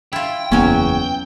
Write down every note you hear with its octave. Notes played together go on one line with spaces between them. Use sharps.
E4 F4 G5
F#1 E2 F#3 A#3 B3 C#4